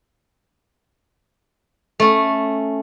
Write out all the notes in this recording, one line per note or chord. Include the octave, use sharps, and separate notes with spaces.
A3 C#4